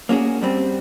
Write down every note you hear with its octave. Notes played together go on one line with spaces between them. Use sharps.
A#3 C#4 F#4 G#4
G2 G3 C4